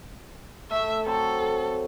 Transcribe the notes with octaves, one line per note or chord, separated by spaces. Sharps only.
A3 E5
F#3 C4 A4 B5